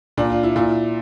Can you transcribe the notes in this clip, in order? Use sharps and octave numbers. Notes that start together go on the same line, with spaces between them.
A#2 D4
F4
E4
A#2 E4